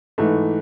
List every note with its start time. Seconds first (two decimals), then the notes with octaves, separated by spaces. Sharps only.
0.18 G#2 E3 A3